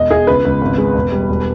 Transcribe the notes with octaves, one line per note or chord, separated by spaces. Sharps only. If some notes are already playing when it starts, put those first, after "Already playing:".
Already playing: E1 D#5
E1 G#4
C#2 B4
C#2
G#1
G#3
E1
G3
E1